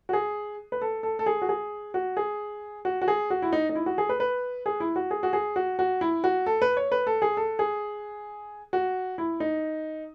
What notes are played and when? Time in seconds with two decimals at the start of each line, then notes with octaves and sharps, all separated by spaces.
0.09 F#4
0.13 G#4
0.72 B4
0.81 A4
1.03 A4
1.19 A4
1.26 G#4
1.42 F#4
1.49 G#4
1.94 F#4
2.17 G#4
2.85 F#4
3.02 F#4
3.08 G#4
3.30 F#4
3.42 E4
3.53 D#4
3.69 D#4
3.75 E4
3.86 F#4
3.98 G#4
4.09 B4
4.20 B4
4.66 G#4
4.80 E4
4.96 F#4
5.11 G#4
5.23 F#4
5.33 G#4
5.56 F#4
5.79 F#4
6.01 E4
6.24 F#4
6.46 A4
6.62 B4
6.77 C#5
6.92 B4
7.07 A4
7.22 G#4
7.37 A4
7.59 G#4
8.73 F#4
9.18 E4
9.40 D#4